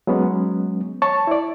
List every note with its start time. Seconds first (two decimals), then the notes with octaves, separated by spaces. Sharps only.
0.07 F#3 G#3 B3 C#4
1.02 C#5 A5 C#6
1.27 E4 D5